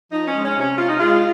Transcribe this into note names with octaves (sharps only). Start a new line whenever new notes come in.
F3 D#4
C#4
G#3
C#4
C3 C#4
C3 F4
D#4
G#3 F4